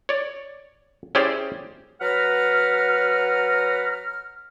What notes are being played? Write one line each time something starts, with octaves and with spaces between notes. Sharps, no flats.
C#5 D5
C#4 E4 G4 G#4 C5 D5
F#3 B4 F#5 A#5 F6